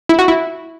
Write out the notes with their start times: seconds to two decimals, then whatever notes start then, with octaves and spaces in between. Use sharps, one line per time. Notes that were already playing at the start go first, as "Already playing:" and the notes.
0.09 E4
0.19 F#4
0.28 E4